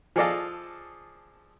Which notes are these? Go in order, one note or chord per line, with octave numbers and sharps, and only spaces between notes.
F3 G#4 A4 D5 D#5 F5